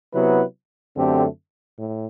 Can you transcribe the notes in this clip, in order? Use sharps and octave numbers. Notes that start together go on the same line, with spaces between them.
C3 F#3 B3 E4 B4
F#2 D3 A3 C4 G4
A2